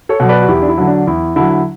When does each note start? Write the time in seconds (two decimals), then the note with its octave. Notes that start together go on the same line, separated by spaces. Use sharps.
0.09 A4 C#5
0.20 B2 F#3
0.29 B4 D5
0.42 F#4
0.48 E2 E4 G4
0.62 D4
0.68 E4
0.78 D3 F#3
0.88 D4
1.07 E2 E4
1.36 D3 F#3 E4